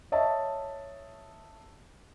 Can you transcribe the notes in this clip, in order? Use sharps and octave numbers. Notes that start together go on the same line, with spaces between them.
C#5 D#5 E5 A5